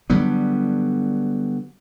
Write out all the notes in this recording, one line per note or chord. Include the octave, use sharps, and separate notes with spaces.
D3 F#3 G3 B3